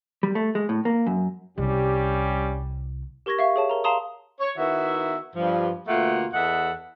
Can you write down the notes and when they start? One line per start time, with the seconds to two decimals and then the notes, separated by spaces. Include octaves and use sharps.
0.23 G3
0.35 A3
0.55 G#3
0.69 A2
0.85 A#3
1.06 F#2
1.58 C2 G3 C#4 G4
3.26 G4 A#4 C#6 G#6 A#6
3.39 E5 F5 C#6
3.56 G#4 C#5 A5
3.70 A#4 A#5
3.84 F5 A5 A#5 C6 D#6
4.40 C#5
4.58 D#3 B3 E4 F#4 E5
5.36 G2 F3
5.88 D2 B2 A3 A#3 F4 F#5
6.34 E2 A4 D#5 E5 F#5